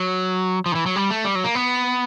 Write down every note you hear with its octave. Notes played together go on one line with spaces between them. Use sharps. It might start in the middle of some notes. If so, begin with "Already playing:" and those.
Already playing: F#3
F3
D#3
E3
F#3
G3
A3
G3
F#3
A#3
B3